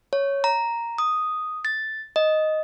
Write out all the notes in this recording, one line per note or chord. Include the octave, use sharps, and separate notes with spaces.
C#5
A#5
D#6
A6
D#5